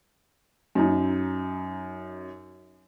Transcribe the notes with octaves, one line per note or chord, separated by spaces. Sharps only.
F#2 D#4